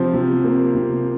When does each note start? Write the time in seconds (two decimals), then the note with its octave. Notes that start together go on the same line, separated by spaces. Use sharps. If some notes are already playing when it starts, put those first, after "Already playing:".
Already playing: C3 F3 C5
0.14 C3
0.44 A#3
0.75 C3